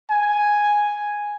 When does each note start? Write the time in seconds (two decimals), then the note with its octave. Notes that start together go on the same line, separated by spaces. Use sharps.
0.10 G#5